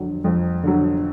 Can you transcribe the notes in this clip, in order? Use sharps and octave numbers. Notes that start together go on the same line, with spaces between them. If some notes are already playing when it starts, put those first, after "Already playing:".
Already playing: F2 D3 F#3
F2
D3 F#3